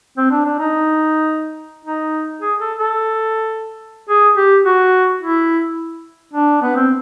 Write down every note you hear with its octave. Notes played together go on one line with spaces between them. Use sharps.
C4
D4
D4
D#4
D#4
G#4
A4
A4
G#4
G4
F#4
E4
D4
B3
C4